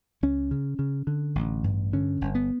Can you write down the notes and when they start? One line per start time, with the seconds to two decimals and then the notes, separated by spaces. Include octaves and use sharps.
0.23 C#2 C#4
0.51 C#3
0.79 C#3
1.07 D3
1.35 A1
1.64 G2
1.93 D3 C#4
2.21 G1
2.35 B3